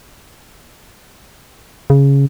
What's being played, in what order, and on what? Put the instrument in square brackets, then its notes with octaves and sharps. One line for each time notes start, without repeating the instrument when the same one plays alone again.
[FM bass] C#3